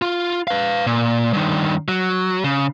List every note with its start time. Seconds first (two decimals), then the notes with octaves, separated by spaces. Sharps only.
0.02 F4
0.48 B4 F5
0.87 A#2
1.33 G2 D#3
1.88 F#3
2.44 C#3